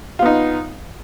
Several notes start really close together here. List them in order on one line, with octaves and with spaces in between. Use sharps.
F4 B3 D#4